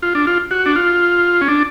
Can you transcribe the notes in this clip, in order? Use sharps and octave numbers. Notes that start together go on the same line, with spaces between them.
F4
D4
F4
F#4
D4
F4
C#4
D4